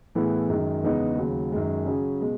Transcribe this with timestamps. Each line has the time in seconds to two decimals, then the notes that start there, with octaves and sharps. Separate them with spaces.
0.15 A2 E3 B3 E4 G#4
0.48 F#2 D#3 G#3
0.83 E2 C#3 G#3 B3 D#4
1.17 D#2 C#3 F#3
1.52 F#2 D#3 G#3
1.85 C#3 F#3 C#4 G#4
2.20 B2 G#3